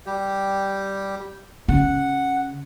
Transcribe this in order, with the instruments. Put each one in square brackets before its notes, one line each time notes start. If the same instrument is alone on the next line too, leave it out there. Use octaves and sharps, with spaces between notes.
[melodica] G3 G4
[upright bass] C#3 C#4 [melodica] F#5